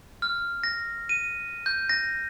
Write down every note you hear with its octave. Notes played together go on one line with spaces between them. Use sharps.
F6
A#6
D#7
G6
A#6